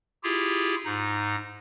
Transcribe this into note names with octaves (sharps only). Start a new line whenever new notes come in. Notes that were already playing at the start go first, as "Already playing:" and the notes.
E4 F4 G4 G#4
G#2 D#4